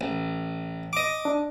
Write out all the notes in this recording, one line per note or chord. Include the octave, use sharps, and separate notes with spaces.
A1
D#5 D6
D4